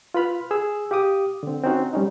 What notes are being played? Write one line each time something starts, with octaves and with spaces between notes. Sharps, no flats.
F4 B4 B5 F6
G#4 E6
G4 F5 D6 D#6
D3 C4
C4 C#4 D#4 F#4
G3 C#4 D#4